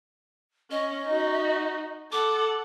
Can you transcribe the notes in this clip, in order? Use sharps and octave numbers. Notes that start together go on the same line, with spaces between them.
C#4 D#5
D#4 F#4
A4 F#5 D6